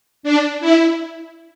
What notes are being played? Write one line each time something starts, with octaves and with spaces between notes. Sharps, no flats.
D4
E4